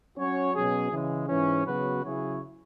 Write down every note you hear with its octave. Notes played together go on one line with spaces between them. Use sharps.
F#3 C#4 F#4 C#5
B2 F#3 C#4 G#4
C#3 E3 G#3
G#2 E3 C#4
C#3 F#3 B3 F#4 B4
C#3 F#3 E4 G#4 C#5